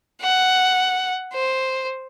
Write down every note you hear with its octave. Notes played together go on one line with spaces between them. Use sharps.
F#5
C5